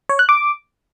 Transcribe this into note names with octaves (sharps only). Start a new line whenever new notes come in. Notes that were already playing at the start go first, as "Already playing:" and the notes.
C#5
F#6
D6